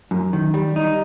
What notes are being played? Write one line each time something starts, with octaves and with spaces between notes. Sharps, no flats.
F#2
D#3
G3
D#4